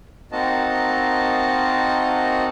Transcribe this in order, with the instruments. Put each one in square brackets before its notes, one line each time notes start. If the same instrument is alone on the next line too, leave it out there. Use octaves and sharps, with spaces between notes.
[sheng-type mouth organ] A#3 C4 D#4 F#4 D#5 A5